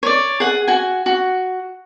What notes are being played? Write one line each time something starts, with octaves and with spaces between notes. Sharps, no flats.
C#5 D5
G#4 F#5
F#4 G#5
F#4